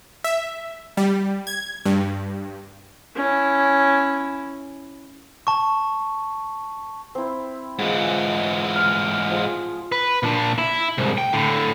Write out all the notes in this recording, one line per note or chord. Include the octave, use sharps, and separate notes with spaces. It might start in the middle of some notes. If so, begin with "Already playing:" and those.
E5
G3
G#6
G2
C#4 E4
A5 C#6
C4 E4
G#2 E3 F4 G#4
F6
F3 G#4 C6
B4
A#2 D4
E4
C2 G#2
G5
A2 D3